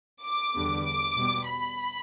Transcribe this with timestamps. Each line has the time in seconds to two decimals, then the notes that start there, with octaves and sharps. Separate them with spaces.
0.23 D6
0.54 E2 D3 G3 B3
0.85 D6
1.16 B2 G3 B3
1.47 B5